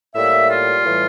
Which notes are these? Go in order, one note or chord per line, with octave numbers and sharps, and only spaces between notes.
A2 G3 A#3 E5
F4
A2 E3 G3